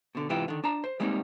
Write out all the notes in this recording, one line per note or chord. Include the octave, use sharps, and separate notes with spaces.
B2 D3
G#2 C3 E3 E4 F4 G4
D3 D#3
D4 A5 A#5
C5
G3 G#3 A#3 C4 C#4 D#4